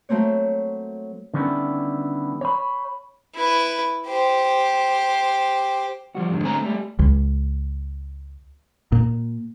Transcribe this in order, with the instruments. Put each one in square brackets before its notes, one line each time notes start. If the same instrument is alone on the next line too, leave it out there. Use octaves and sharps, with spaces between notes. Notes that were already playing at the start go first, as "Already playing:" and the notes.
[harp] F#3 A3 A#3 C4 C#5
[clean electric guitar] D3 D#3 G3 B3 C#4 E4
C#5 B5
[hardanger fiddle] E4 B4
G4 C5
[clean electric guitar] F3 G3 F#4
F2 G#2 D3
D3 A3 C4 C#4 G#5 A#5
G3 A3
[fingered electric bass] C#2
A#2